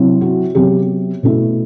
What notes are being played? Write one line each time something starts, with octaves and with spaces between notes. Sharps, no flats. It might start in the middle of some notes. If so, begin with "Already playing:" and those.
Already playing: C3 F#3 C4 E4
F#4
C3 F#3 B3 G4
B2 A3 E4